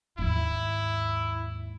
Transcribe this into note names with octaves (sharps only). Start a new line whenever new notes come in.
D#2 G#2 E4